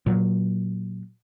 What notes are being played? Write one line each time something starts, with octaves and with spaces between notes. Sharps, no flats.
A#2 F#3